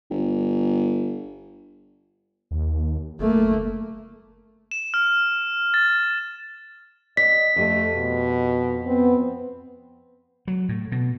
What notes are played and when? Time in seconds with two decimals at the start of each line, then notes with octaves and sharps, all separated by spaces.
0.10 G1
2.51 D#2
3.20 F#1 A3 A#3
4.71 E7
4.94 F6
5.74 A6
7.17 D5 D#5 B6
7.56 F2 A3 G4
7.95 B2
8.86 B3 C4
10.48 F#3
10.69 A2
10.92 B2